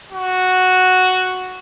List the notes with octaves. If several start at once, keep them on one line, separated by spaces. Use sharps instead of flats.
F#4